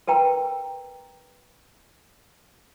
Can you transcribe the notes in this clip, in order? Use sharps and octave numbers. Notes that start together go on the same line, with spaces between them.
A#4 B4 G5 A#5